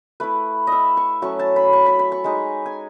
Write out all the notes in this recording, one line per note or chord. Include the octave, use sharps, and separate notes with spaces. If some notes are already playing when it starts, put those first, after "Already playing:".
A3 E4 B4
D#5 E5
C#6
F#3 A3 C#4 C#6
A5
B5
C#6
B5
B5
C#6
G#3 D#4
G#5